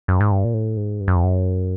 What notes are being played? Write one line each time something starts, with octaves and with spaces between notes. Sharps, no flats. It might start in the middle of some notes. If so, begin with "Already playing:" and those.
F#2
G#2
G2
A#2
A2
G#2
G2
F#2
F2
F#2